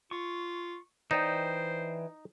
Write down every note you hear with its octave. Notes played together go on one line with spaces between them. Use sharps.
F4 C#6
E3 D#4 C5 D5 G5